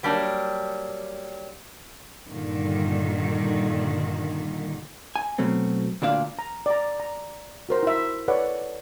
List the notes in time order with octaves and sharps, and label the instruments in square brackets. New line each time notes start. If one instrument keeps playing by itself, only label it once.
[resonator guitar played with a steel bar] F#3 G3 A#3 D4
[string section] G2 A#2 D3 D#3
[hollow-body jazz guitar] G#5
B2 F#3 A3 C4
D2 A#2 D4 F5
[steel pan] A#5
D5 A#5
A#5
F#4 A#4 C5
E4 E5
A4 B4 C#5 D5 F#5